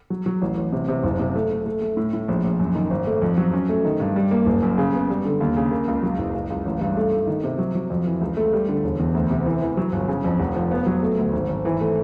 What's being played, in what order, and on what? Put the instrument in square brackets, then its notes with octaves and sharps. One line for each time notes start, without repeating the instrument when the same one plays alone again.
[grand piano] F#3
F#3
A1
A1
C3
C3
F#1
C3
A3
A3
A3
A3
A2
A2
A#1
A#1
F#2
D#3
G#1
A3
F2
F#3
C#4
A3
D#3
G2
G3
A#3
F#1
F#2
C#3
B3
G3
D3
D#2
C#3
A#3
C#2
F#3
F#1
C#2
C#2
A1
G2
A3
A3
D#3
C3
F#3
F#3
F2
E3
C#2
A3
G3
D3
E1
E2
D2
C3
E3
E3
F#3
G1
C#3
F2
F1
F3
B3
F#3
A3
D2
G#1
G#1
E3
A3